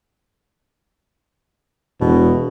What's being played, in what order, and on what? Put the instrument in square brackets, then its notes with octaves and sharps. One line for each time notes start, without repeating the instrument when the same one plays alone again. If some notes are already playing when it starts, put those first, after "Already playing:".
[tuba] E1 [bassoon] B2